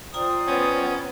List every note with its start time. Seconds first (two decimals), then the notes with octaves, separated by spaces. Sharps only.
0.14 F4 C5 D5 G5 A#5 D#6
0.47 B3 C#4